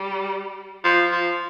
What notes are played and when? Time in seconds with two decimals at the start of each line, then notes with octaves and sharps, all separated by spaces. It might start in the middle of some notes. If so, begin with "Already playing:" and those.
Already playing: G3
0.84 F3
1.12 F3